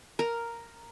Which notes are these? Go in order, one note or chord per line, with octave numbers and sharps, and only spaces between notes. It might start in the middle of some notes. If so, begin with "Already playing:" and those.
A#4